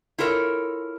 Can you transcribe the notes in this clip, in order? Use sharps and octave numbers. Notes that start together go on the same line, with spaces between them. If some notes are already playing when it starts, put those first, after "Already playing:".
E4 F4 A4 A#4 C#5